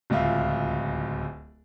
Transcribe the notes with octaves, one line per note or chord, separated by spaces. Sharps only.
D1 C#2 F4 E5